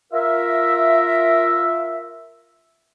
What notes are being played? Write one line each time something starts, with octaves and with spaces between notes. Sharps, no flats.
F4 A#4 E5